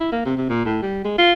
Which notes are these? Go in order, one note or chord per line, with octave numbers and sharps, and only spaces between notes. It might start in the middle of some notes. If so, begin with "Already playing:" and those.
E4
A#3
C3
C3
A#2
A2
G3
G#3
F4